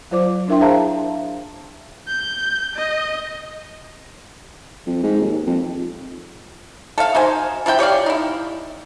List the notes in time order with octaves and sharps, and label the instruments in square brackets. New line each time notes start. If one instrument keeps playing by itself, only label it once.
[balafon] F#3 F4 C5 D5 D6
D4 E4 A#4 E5 G5 C6
G#4 C5 E5 F5 A5 A#5
[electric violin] G6
D#5
[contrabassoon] F2
G#2
D#2
F2
[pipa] A4 E5 F5
D#4 F#4 C5 G#5
F3 E4 A#4 G5
G4 C#5 D5 F5
D#4 E4